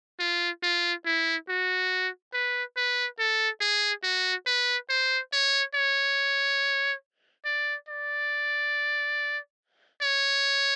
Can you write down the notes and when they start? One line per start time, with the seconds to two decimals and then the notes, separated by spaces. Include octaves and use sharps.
0.20 F4
0.63 F4
1.06 E4
1.49 F#4
2.34 B4
2.77 B4
3.19 A4
3.61 G#4
4.04 F#4
4.46 B4
4.90 C5
5.33 C#5
5.75 C#5
7.45 D5
7.88 D5
10.02 C#5